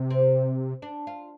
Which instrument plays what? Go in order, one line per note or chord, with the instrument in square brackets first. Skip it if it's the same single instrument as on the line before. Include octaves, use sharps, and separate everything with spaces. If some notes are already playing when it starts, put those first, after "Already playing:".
Already playing: [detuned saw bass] C3
[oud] C4
D4
F4